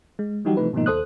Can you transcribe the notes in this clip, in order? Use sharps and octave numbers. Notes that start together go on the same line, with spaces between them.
G#3
E3 F#3 G3 D#4 F#4 G4
C3 E3 F3 A3 D#4 B4
G#2 B2 D#3 F3 A#3 D#4
D#2 A4 C5 D#6 F#6